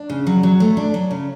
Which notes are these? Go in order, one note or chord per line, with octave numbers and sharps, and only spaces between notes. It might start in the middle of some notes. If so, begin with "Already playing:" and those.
Already playing: D4
C#3
F#3
F#3
A3
D4
F#3
C#3